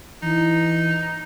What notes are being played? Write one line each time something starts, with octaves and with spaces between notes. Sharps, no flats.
E3 D#4